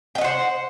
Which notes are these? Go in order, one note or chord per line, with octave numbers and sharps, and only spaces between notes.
C5 D#5 F#5 G5